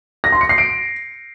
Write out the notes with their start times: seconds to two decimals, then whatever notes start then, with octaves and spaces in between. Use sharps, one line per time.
0.24 A#6
0.32 C6
0.41 C#7
0.49 C7
0.58 D7